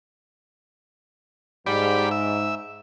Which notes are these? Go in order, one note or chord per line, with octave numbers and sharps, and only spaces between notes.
G#2 G4 D5 B5
E5